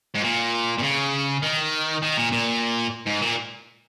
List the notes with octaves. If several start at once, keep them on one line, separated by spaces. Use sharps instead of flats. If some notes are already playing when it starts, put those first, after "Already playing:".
G#2
A#2
A#2
C#3
D#3
D#3
A#2
A#2
G#2
A#2